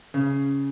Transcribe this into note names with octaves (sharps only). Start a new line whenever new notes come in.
C#3